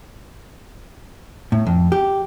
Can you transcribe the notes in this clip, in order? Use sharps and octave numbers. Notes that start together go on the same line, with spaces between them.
A2
F2
G4